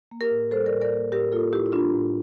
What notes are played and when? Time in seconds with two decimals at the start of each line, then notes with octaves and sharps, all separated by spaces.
0.11 A#3
0.21 G4 A#4
0.31 A2
0.51 G3 A4 C5
0.66 A#4 D5
0.72 A2
0.81 A#4 D5
0.92 A#3
1.12 A2 G4 A#4
1.32 A#3 F4 A4
1.53 A2 E4 G4
1.66 E4
1.72 G3 D4 F4
1.94 A2